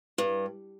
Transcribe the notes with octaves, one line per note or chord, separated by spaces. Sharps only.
G2